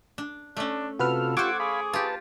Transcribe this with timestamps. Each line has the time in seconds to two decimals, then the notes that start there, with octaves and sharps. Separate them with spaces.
0.18 D4
0.57 A3 C#4 D4
0.99 C3 F4 F#4 A4 B4 F6
1.37 F4 G4 A4 C5 F#5 C#6 D6 G#6
1.60 G#4 F5 B5
1.93 F4 G4 B4 A5